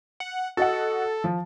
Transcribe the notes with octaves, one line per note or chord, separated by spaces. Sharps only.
F#5
F#4 A4 D#5 F#5
F3